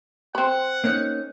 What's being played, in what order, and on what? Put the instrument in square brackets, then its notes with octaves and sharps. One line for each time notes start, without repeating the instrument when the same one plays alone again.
[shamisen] C4 B5 [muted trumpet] F#5
[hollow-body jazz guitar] A#3 C#4 D#4